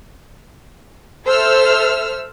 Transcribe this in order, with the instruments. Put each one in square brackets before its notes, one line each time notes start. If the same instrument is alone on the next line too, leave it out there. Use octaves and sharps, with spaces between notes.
[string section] A4 C5 E5 E6 F6